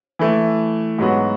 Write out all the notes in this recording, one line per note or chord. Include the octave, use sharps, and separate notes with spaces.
E3 A3 E4
G#2 F#3 B3 F#4